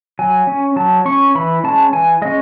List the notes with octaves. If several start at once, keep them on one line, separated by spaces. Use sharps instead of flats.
F#3 G#5
C#4
F#3 A5
C#4 C#6
E3 B5
G#3 C#4 A5
E3 G#5
G#3 C#4 D#5